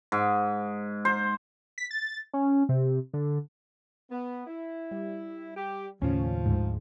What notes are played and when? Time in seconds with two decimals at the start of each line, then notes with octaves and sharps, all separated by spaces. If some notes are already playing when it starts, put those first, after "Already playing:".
0.12 G#2
1.05 C5
1.78 B6
1.91 A6
2.33 C#4
2.69 C3
3.14 D3
4.10 B3
4.47 E4
4.91 G3
5.57 G4
6.02 D#2 A2 C#3 F3 C#4
6.45 D2 G#2